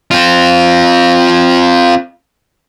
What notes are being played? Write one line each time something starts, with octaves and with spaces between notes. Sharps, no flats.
C4 F4